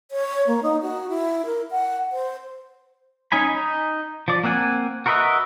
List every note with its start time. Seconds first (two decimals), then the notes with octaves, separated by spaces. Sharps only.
0.11 C#5
0.47 A#3
0.63 D#4
0.82 F#4
1.09 E4
1.46 A#4
1.71 F#5
2.12 C5
3.32 C#4 D#4 G#5 B5
3.55 D#4
4.28 F3 D5
4.44 A#3 C4 F#5 G#5
5.06 F#4 A#4 B4 D#5 E5